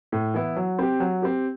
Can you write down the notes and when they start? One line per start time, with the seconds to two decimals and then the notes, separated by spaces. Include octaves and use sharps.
0.12 A2
0.34 E3 B3 E4
0.56 F#3
0.79 C4 G4
1.00 F#3
1.22 C4 G4